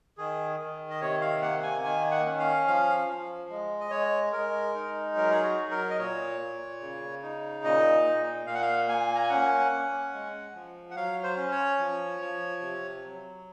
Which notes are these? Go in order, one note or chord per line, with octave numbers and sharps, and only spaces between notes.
D#3 G#4
D#3
D#5
C3 C#5
F5
A#3 F#5
G#5
D#3 G#5
F#5
C#4
F5
F3 F5
F3
G#3
D#5
G#3 C#5
G#3 A#4
D#4
F#3 A#4
G#4
F#4
F#3
A#4
D#5
A#2 C#5
A#2
C#3
D#4
A#2 D#5
A#2
A#2 F5
F#5
F5
A#3 G#5
A#5
G#5
C#4 F#5
C#4
G#3
F3
F#5
F#3 F5
C5
C#4
C#5
F3
F3
C3
F#3